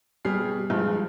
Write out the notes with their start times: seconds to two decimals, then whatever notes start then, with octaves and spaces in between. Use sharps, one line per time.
0.25 B2 G3 G#4 F6 C7
0.70 G2 F3 G#3